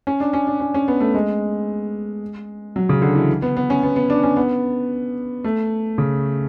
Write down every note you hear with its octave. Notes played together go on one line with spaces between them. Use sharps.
C#4
D4
C#4
D4
C#4
C#4
B3
A3
G#3
F#3
C#3
D3
E3
B3
B3
C#4
B3
B3
D4
C#4
B3
A3
C#3